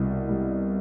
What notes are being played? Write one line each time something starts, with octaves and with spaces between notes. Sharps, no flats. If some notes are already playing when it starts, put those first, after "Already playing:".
Already playing: C2 B2
G3